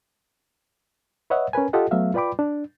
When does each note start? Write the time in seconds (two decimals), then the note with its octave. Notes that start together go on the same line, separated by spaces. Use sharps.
1.30 B4 C#5 D#5 E5 F#5
1.53 C#4 A#4 B4 G#5
1.73 F4 G4 A4 D#5 F#5
1.91 F#3 A3 B3 E5 F5
2.14 F4 B4 D5 G5 B5 D6
2.39 D4